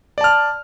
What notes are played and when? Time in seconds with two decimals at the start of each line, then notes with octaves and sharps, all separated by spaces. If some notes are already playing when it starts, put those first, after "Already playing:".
0.18 D5
0.21 A5
0.24 F6